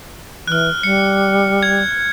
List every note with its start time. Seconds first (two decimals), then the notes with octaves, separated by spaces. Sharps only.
0.48 E3 F6 F#6
0.83 G3 C#7
1.63 G#6